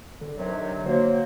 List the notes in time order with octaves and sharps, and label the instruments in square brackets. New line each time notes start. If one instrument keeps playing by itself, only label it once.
[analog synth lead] D3
[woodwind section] C3 D#3 F#3
[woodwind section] F#3 A#3 [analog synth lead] C5